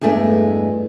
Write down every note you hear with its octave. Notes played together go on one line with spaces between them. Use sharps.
E2 G2 G#3 A3 B3 D4